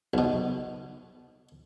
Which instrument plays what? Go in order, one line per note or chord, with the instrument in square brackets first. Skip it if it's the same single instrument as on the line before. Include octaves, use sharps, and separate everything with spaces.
[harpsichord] B1 B2